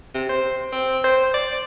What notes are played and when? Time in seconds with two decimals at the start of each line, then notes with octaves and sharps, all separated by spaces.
0.14 C3
0.29 C5
0.72 C4
1.04 C5
1.34 D5